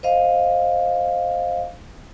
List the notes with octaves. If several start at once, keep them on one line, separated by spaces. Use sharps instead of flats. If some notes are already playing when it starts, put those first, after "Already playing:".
C5 D#5 F5